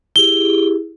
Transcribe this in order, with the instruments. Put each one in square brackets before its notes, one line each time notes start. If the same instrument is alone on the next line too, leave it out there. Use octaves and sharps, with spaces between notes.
[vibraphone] E4 G4 G#4 [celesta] G7